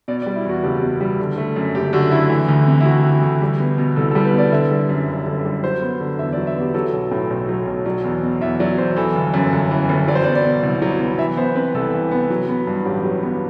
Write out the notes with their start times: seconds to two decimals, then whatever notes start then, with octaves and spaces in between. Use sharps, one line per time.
0.08 B2 D5
0.22 D5
0.26 G3
0.35 E4
0.45 E2 F#4
0.64 F#1 G4
0.82 B2
1.01 G3
1.19 D3
1.37 A3
1.56 F#2
1.74 F#1 G4
1.93 D3 F#4
2.11 A3 E4
2.30 E3
2.49 D2
2.67 C3
2.80 E4
2.85 D2 F#4
3.04 E3
3.23 D2
3.42 G3
3.60 B3
3.78 B2
3.96 C2 A4
4.11 A4
4.15 G3
4.25 B4
4.34 B3 D5
4.52 D3 E5
4.71 G3
4.89 F#2
5.08 G1
5.26 D3
5.45 G3
5.63 F#3 C5
5.82 B3
6.00 D3
6.19 E2 E5
6.33 D5
6.38 F#3
6.47 E5
6.56 B3 G4
6.74 F#3 A4
6.93 B1
7.11 A2
7.30 B1
7.48 F#3
7.67 B1
7.85 F#3 D5
8.04 E2
8.23 B2
8.41 E2 E5
8.60 F#3 D5
8.78 E2 C5
8.96 E3 A4
9.15 G1
9.34 F#2
9.52 G1
9.71 E3
9.89 G1
10.08 F#3 D5
10.15 C5
10.24 D5
10.27 B3
10.35 D5
10.45 B2
10.63 C2
10.82 F#3
11.00 B3
11.18 E3 E5
11.37 B3 C5
11.56 C3 B4
11.74 C2 A4
11.93 E3
12.11 B3
12.30 F#3
12.49 B3
12.67 G2
12.85 A1 G4
13.04 F#3
13.23 B3